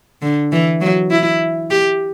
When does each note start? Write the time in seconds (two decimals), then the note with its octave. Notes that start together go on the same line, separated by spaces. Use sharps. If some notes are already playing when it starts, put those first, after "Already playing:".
0.22 D3
0.52 E3
0.81 F#3
1.11 E4
1.70 G4